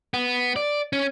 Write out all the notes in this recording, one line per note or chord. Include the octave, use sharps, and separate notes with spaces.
B3
D5
C#4